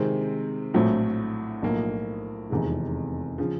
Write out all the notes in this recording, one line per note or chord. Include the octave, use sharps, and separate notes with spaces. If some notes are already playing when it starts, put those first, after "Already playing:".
Already playing: C3 D#3 G#3 C4
A#1 A2 F#3 A3 C4
B1 A2 F3 A#3
F1 E2 C3 D#3 G#3
C#3 F3